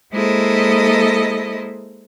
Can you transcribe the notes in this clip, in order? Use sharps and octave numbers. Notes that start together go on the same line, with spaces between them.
G#3 A#3 E4 A4 C5 D#5